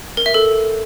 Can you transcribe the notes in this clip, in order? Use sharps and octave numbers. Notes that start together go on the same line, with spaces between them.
A#4
E5
A4